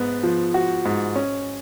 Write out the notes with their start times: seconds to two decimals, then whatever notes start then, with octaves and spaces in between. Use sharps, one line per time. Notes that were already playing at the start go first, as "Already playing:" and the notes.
Already playing: G#2 B3
0.23 F3
0.54 F#4
0.85 G#2
1.16 C#4